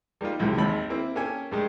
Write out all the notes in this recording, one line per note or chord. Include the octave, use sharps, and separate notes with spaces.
G3 A#3 D#4 F4
C#2 F#2 A2 C3
G#1 D#2 B5
A#3 C4 E4
A#3 C#4 G4 A4 C#5 G#5
G2 G3 G#3